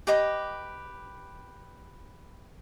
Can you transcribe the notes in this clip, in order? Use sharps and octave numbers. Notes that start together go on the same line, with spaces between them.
G4 B4 D#5 D6